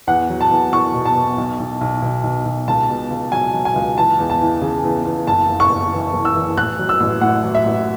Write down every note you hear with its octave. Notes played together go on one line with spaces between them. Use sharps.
E2 F#5
F#3
A5
E2
E2 C#6
B2
A5
B2
B1
B1
B1
B1
B1
B1
C#2 A5
B2
C#2
F#3 G#5
F#3
G#5
C#2
E3 A5
E2
A5
E3
C#3
E2
E2
F#1 A5
F#1
C#6
F#1
E3
F#1
E6
E3
A1 F#6
F#3
E6
A1
A2 F#5
F#3
E5
A1